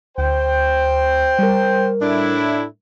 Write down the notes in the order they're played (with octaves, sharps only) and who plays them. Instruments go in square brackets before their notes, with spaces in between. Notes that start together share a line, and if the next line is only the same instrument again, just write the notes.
[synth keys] D2 [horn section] C5 G5
[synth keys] G3 A#4
[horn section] A2 D4 E4